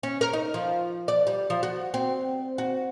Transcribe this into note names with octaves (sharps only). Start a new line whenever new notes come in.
C#4
A#4
D#4
F3
D5
G3
F3
F#4
C4
F#4